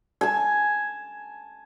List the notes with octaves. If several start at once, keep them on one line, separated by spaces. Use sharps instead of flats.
G#5 A5